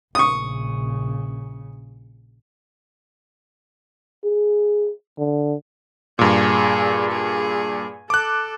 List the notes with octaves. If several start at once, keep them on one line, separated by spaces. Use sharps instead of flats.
A#1 C#3 C#6 D#6
G#4
D3
G2 A#2 G#4
G#4
A4 D6 F#6